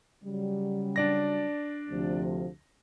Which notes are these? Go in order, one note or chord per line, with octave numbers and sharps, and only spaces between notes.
C#3 F#3 G3
D4 D5 A#6
D2 C3 F3